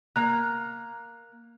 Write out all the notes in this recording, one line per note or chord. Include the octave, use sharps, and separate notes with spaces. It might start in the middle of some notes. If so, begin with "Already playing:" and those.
A#3 A#5 F#6